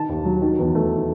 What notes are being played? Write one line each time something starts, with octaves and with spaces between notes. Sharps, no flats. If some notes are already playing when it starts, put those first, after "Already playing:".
Already playing: D#3 A5
D#2
F#3
D#3
E2
A3